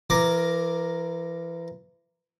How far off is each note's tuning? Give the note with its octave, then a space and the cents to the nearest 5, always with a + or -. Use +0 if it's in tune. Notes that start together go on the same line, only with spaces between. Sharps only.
E3 +30 A#4 +0 D6 +0